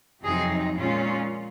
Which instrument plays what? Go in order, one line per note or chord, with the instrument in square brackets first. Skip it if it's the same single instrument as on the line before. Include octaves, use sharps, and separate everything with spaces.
[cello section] F2 C3 F#3 C4 D#4 G#4
A#2 G#3 C#4 F4